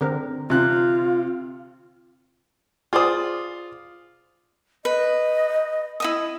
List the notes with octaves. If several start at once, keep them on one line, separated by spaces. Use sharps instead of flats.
D3 C4 A#4
C3 F4 F#6
F4 G#4 C5 D5 D#6
B4 D#5
E4 D#5 D#6